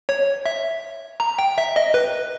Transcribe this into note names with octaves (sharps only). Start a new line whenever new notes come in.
C#5
E5
A#5
G5
E5
D#5
B4